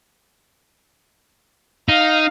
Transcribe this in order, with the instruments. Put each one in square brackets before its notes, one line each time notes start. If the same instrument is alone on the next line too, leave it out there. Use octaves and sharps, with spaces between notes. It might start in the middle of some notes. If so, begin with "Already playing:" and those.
[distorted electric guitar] D#4 [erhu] F5